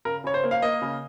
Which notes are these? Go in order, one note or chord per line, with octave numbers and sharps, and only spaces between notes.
C#3 A#4
C#3 C#5
C5
A#3
F5
A#3 D#5
C#3